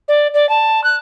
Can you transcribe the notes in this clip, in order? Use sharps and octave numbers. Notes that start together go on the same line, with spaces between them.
D5
D5
A5
F#6